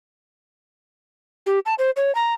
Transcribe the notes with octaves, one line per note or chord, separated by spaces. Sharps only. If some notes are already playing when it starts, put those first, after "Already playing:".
G4
A5
C5
C#5
A#5